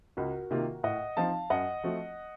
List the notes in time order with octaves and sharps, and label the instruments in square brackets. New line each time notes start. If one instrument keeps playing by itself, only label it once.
[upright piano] C#2 [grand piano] F#4 A#4
[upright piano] C3 D#3 A#3 F4
[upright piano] A2 [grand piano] D#5 F#5
[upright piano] F3 C4 D#4 [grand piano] F5 A5
[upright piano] F#2 [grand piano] D#5 F#5
[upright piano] F3 A3 C4 F#4